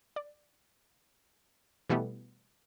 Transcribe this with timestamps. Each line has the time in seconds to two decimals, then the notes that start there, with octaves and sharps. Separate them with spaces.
0.16 D5
1.89 B2 E3 G3 A3 B3